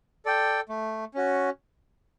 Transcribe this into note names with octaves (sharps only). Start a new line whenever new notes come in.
A4 D5 G5
A3
C#4 F#4